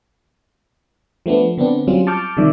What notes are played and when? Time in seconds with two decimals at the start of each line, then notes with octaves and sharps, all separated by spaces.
1.26 F3 A3 B3 D4
1.57 D3 B3 C4 D4
1.87 F#3 G3 C4 C#4 F4
2.07 A5 C#6 D6 F6 G6
2.37 C3 D#3 F3 G3 D5 E5